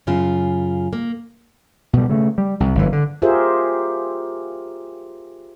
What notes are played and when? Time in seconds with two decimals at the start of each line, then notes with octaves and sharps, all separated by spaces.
0.07 F#2 C#3 F4
0.93 A#3
1.93 B2 G3
2.10 C#3 A3
2.38 G3
2.60 C2
2.75 G1 F#2 E3
2.92 D3
3.22 F4 G4 G#4 A#4 C5 E5